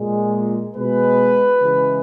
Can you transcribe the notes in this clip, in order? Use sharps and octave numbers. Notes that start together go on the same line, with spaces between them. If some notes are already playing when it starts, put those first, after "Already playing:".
Already playing: A#2 G#3
B2 G#3 B4
C#3 E3 G#3